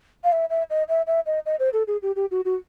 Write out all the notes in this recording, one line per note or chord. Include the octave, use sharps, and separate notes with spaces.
F5
E5
E5
D#5
E5
E5
D#5
D#5
C5
A4
G#4
G4
G4
F#4
F#4